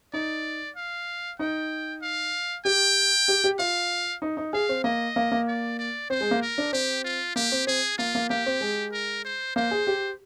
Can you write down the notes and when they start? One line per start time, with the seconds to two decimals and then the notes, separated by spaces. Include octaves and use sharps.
0.13 D#4 D5
0.76 F5
1.39 D#4 G5
2.02 F5
2.65 G4 G5
3.28 G4
3.44 G4
3.59 F4 F5
4.22 D#4
4.37 D#4
4.53 G#4 F5
4.69 C4
4.84 A#3 D#5
5.16 A#3
5.32 A#3
5.48 D5
5.79 D5
6.10 C4 C5
6.21 G#3
6.31 A#3
6.42 A#4
6.58 D4
6.73 C4 G4
7.05 F4
7.36 A#3 G4
7.52 C4
7.67 C4 G#4
7.98 A#3 F4
8.15 A#3
8.30 A#3 G4
8.46 C4
8.61 G#3
8.93 A#4
9.25 C5
9.56 A#3 C5
9.71 G#4
9.87 G4